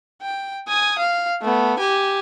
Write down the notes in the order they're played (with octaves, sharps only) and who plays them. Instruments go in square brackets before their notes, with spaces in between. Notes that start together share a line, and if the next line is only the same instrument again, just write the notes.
[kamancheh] G5
G#5 D#6
F5
A3 B3
G4 G#5